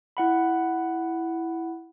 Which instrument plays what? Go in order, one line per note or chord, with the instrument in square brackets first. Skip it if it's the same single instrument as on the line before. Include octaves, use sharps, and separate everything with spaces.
[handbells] E4 F#5 B5